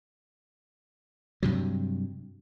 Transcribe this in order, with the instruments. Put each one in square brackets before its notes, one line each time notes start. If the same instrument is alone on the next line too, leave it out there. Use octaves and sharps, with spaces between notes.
[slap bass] G2 C3 F#3